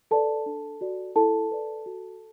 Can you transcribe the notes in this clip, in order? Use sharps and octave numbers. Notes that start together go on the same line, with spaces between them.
A4 B4 D5 A5
D4
F#4 D5
E4 A4 A5
B4 D5
F#4